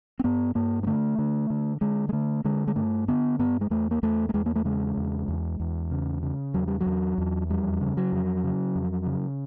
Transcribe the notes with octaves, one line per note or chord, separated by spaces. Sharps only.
C4
G2 B3
G2 A#3
G#3
D3 A3
D3
D3
D3 G#3
G#3
D3 A3
D3 G#3
G#3
G2 A3
D3 B3
G2 B3
G#3
E2 A3
A#3
E2 A3
A3
E2 G#3
A#3
A3
C#3 G#3
E2
E2
E2
C#3
C#3
E2 F#3
G3
F#3
E2
E2
F2 G3
C#3
F#3
F2
C#3
F2
C#3